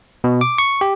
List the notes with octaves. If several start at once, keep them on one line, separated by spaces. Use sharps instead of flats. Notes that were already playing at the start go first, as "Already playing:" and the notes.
B2
D6
C#6
G4